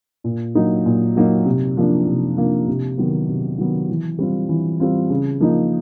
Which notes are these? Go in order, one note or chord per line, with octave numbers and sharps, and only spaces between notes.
A#2
F#3 A#3 D#4
A#2
F#3 A#3 D#4
C3
F3 A#3 D4
C3
F3 A#3 D4
C3
D#3 F#3 B3
C3
D#3 F#3 B3
E3
G3 C4 F4
E3
G3 C4 F4
C#3
F3 A#3 D#4